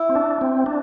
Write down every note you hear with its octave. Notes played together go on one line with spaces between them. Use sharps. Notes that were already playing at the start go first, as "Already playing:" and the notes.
Already playing: E4
C4
D4
C4
D4